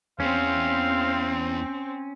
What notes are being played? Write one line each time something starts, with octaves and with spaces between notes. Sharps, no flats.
E2 C4 C#4 F5